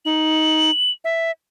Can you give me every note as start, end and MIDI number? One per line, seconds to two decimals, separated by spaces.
0.05 0.70 63
0.05 0.91 102
1.04 1.31 76